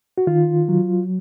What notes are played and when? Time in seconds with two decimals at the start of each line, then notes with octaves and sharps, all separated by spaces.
0.18 F#4
0.27 D#3 F4
0.69 F#3